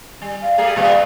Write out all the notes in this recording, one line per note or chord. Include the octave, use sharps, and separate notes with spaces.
G3
F5
G3 A3 G#4
A2 G3 B3 F5